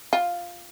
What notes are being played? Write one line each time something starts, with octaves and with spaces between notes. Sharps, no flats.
F4